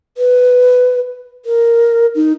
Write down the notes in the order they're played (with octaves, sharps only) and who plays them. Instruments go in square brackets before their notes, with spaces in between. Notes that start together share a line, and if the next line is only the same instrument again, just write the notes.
[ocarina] B4
A#4
D#4